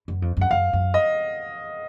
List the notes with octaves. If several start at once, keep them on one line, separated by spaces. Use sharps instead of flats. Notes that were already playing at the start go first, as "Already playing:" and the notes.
F#2
F2
F#2 F#5
F#2 F5
F#2
D#5